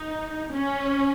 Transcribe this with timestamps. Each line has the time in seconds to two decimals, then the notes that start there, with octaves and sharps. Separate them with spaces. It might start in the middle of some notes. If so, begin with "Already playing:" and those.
Already playing: D#4
0.52 C#4